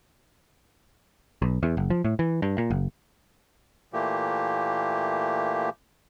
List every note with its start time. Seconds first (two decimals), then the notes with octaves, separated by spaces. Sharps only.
1.42 B1
1.63 E2
1.77 F#1
1.90 F3
2.04 A2
2.19 E3
2.42 G2
2.58 A#2
2.70 F#1
3.93 A#2 E3 A3 A#3 G4